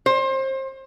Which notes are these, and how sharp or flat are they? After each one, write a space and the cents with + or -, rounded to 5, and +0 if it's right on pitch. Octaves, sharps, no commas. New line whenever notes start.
C5 +30